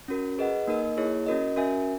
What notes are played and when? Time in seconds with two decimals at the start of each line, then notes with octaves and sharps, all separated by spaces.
0.08 C#4 F#4 A#4
0.39 G#4 B4 D#5 F#5
0.67 A#3 D#4 A#4 D#5
0.97 A#3 E4 G#4 C#5
1.26 C#4 F#4 A#4 D#5
1.56 C#4 F#4 A#4 E5 G#5